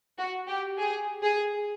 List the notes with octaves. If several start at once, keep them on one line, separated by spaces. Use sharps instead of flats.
F#4
G4
G#4
G#4